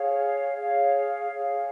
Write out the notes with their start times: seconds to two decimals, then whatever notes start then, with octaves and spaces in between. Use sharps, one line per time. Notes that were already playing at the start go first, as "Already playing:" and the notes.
Already playing: G#4 C#5 F5
0.55 G#4 C#5 F5
1.32 G#4 C#5 F5